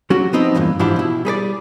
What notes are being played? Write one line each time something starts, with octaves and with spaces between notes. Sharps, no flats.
F#3 C#4 F#4 G4
F3 B3 C4 D#4 D#5
E2 G2 A#2 E3
G#2 E3 F3 D4 E4 G4
B2 E4
G3 G#4 B4 D5